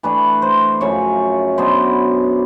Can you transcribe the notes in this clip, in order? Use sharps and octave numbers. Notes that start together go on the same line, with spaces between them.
E3 A3 D4 B4
C5
F#2 C#3 F3 C#5
B2 F#3 B3 D4 C5